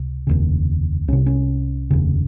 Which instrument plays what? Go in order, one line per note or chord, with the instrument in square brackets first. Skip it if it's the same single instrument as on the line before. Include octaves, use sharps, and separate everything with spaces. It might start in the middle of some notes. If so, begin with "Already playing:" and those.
Already playing: [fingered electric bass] C#2 C3
F1 D#2 C#3
C2 C#4
C3
C#4
F1 D#2 C#3